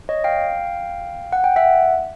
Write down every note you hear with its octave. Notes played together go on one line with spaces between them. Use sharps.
C#5 D#5
F5 G5
F#5
G5
E5 F#5